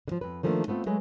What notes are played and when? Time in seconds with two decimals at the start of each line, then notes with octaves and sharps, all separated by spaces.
0.08 D3 F3
0.21 F2 B4
0.43 D#3 F3 A3 A#3 C#4 D4
0.68 A3 B3 C4 F4
0.86 F#3 G#3 A3 B4